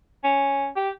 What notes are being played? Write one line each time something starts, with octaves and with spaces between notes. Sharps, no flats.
C#4
G4